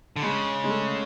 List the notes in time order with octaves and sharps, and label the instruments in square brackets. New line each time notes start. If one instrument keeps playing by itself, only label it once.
[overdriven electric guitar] D3
[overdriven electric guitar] C#3 [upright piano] G#3
[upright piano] G#3
A3